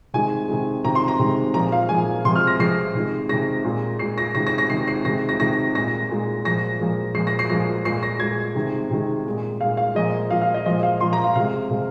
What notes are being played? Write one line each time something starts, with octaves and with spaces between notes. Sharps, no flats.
C3 D#3 G#3 G#5
C3 D#3 G#3
C3 D#3 G#3 A#5
C6
A#5
C3 D#3 G#3
A#2 F3 G#3 A#5
F5
A#2 F3 G#3 G#5
C3 F3 G#3 C6
F6
A#6
C3 F3 G#3 C7
C3 D#3 G#3
C3 D#3 G#3 A#6
A#2 G#3
A#2 G#3 C7
A#6
C3 D#3 G#3 A#6
A#6
A#6
C3 D#3 G#3 C7
C7
C3 D#3 G#3 A#6
A#6
C3 D#3 G#3 A#6
A#2 G#3 A#6
A#2 G#3
A#2 F3 G#3 A#6
A#2 F3 G#3
A#2 F3 G#3 C7
A#6
C7
A#2 F3 G#3 C7
A#2 G#3 C7
A#6
A#2 G#3 G#6
C3 D#3 G#3
C3 D#3 G#3
A#2 G#3
A#2 G#3 F5
F5
A#2 F3 G#3 D#5
A#2 F3 G#3 F5
F5
D#5
A#2 F3 G#3 D#5
F5
A#2 F3 G#3 C6
A#5
F5
C3 G#3 F5
C3 G#3